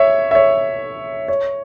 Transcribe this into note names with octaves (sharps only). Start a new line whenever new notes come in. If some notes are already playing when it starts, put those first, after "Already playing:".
Already playing: C#5 E5
E5
C#5
C#5